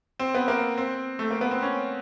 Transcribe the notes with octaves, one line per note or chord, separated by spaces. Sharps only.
C4
B3
A#3
C4
A3
A#3
B3
C4
C#4